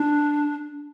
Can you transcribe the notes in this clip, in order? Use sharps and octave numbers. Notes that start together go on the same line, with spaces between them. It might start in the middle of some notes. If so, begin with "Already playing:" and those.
Already playing: D4